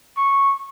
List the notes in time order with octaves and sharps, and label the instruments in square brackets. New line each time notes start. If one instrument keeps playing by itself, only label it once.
[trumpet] C#6